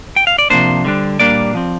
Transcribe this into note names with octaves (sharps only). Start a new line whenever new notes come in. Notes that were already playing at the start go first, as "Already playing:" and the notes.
G5
F5
D5
C3 F3 A#3 D4 C5
D3 G3 D4
A#2 G3 A#3 D4 D5
F3 C4